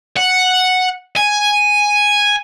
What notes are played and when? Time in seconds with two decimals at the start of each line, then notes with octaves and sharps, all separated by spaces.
0.17 F#5
1.17 G#5